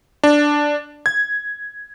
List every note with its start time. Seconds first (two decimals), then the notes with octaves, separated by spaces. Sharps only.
0.23 D4
1.06 G#6